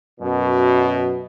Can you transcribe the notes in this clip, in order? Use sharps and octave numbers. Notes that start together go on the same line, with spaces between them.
F#2 B2